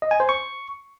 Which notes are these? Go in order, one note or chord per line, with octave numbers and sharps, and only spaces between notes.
D#5
G#5
C5
C#6